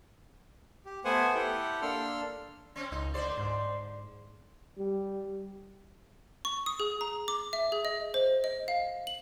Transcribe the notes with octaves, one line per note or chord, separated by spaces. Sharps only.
G4
A3 B3 C5 F#5 G#5
E4 G4 A4 F#5 G5
A#3 D4 A4 C6 E6 F6
C4 C#4
C#2 D#4
D3 C5 D5
G#2
G3
C#6
D#6
G#4
A#5
D6
E5
G#4
D#5
C5
D#5
F5
F#7